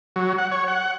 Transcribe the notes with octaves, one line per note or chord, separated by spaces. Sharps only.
F#3
F#5
C#5
F#5